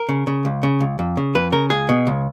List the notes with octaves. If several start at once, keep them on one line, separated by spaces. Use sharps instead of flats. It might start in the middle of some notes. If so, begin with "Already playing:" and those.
Already playing: A#4
C#3
C#3
C#2
C#3
C#2
F2
C#3
F2 B4
C#3 A#4
C#2 G#4
B2
C#2